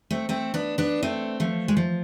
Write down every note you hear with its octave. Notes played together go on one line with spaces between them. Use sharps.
A3 C4
A3 C4
B3 D4
B3 D4
A3 C4
F3 A3
G#3
F3